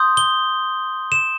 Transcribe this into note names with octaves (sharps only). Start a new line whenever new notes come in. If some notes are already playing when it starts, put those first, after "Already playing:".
Already playing: C6 D#6 G6
G7
E7